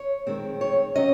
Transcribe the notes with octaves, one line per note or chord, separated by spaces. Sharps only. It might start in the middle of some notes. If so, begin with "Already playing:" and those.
Already playing: C#5
F2 D#3 G#3 C4
C#5
C3 F#3 C#4 D#5